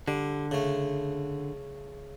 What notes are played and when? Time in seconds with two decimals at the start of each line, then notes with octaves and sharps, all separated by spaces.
0.08 D3 G3
0.51 C#3 A3